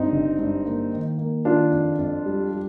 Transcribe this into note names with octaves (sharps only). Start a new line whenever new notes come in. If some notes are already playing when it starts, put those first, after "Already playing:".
Already playing: G2 C4 D#4
G1
G2
A#3
D#3
A#3
D#3 D4 F4
F2
F2
G3
G3